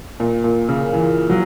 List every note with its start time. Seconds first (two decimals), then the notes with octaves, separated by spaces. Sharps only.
0.20 A#2
0.44 A#2
0.69 C#3
0.93 E3
1.30 F#3